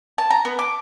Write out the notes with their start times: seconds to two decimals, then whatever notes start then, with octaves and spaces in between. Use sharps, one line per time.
0.18 A5
0.31 A#5
0.45 B3
0.59 D6